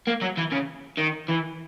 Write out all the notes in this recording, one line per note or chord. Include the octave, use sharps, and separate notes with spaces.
A#3
F#3
E3
C#3
D#3
E3